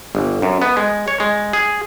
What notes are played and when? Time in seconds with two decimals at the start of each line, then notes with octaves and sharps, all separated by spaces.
0.15 G1
0.42 F#2
0.62 B3
0.77 G#3
1.08 C#5
1.20 G#3
1.53 G#4